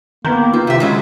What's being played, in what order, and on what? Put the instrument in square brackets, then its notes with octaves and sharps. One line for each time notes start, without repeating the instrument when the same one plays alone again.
[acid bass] D#3 [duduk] A#3 [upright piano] B3 A#5 G6
[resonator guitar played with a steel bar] C4 [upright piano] F4
[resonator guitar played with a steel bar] A2 E5 [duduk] C3
[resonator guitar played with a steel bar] C#3 F#3 C#4 [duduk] G#3